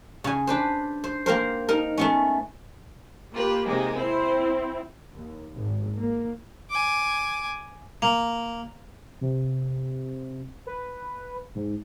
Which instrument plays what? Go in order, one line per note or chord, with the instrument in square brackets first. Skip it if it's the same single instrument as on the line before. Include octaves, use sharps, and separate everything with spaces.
[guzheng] C#3 G#5
D4 B4 C5
C5
A#3 C4 A#4 C5
D#4 A#4
A3 B3 C#4
[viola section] A#3 G4 [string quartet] F4 B4
[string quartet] C3 G#3 D#4
[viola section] C4 E4 [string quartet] C5
[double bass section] D#2
G#1
A#3
[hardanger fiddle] G#5 D6
[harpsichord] A#3
[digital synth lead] C3
B4
G#2